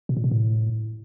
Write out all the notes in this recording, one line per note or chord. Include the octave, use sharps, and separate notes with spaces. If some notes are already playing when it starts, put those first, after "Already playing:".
B2
A#2
B2
A2